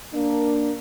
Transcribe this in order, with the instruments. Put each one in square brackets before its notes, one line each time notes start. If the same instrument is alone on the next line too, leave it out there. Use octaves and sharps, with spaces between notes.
[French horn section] A#3 D4